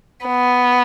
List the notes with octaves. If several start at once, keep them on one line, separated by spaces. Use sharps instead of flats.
B3